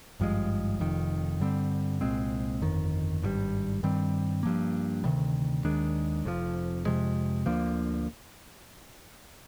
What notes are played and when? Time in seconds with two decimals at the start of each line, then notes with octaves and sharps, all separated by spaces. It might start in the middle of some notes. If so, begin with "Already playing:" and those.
0.20 G#1 G2 F3 G#3
0.80 F1 F2 D#3
1.40 G2 D3 G3 C4
2.01 C2 A#2 G#3 C4
2.61 G1 F2 D#3
3.22 G#1 G2 D#3 G3
3.83 G2 D#3 G3 C4
4.43 G2 F3 A#3
5.04 D2 C3 D#3 G3
5.64 D#2 D#3 G#3 D4
6.25 F1 F2 C3 F3
6.86 F2 C3 F3 G#3
7.46 D2 D3 F3 A#3